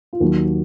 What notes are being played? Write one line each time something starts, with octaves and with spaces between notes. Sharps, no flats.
F4
D#2 D#3 F#3 F#4